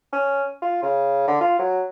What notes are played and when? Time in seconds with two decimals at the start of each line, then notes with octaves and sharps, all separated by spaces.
0.13 C#4
0.62 F4
0.83 C#3
1.28 D3
1.41 F4
1.59 F#3